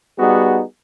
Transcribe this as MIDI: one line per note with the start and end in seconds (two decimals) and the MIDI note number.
0.19 0.63 55
0.19 0.63 59
0.19 0.63 63
0.19 0.63 66
0.19 0.63 68